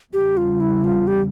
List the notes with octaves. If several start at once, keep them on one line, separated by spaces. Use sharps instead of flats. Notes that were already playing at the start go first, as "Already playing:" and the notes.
E2 C#3 G3 G4
F4
E4
F4
G4